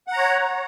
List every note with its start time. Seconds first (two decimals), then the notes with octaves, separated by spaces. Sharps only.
0.07 F#5
0.12 A#5
0.17 C#5